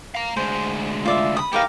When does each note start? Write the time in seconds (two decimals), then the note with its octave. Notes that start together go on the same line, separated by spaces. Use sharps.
0.14 F5 A#5
0.37 D2 G#3 C5
1.06 F4 D5 E5
1.37 B5 D#6
1.53 B3 D#4 G4 A#4 F5